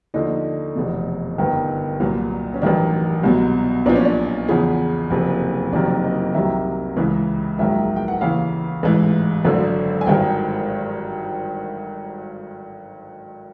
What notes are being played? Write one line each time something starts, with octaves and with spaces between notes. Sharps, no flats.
D#2 D3 F3 D#4
F1 E2 B2
G1 G2 D#3
C2 A#2 F#3
C#4
A1 G2 D#3 F#3 D4
C2 B2 F#3
B1 A#2 F3 D4
C#4
D4
E2 C#3 F3 G#4
F#1 F2 C3
F#1 F2 C3 D#3 F#3 D5
D#5
C2 C3 D#3 F#3 E5
C#2 C#3 E3
A#1 G#2 D#3 F#3 E5
G5
F#5
D#2 C#3 E3 F5
A1 G#2 E3
G#1 F#2 D3
G#5
G#1 G2 D#3 G5